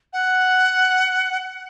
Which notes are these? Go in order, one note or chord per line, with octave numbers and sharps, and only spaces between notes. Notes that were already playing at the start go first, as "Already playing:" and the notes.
F#5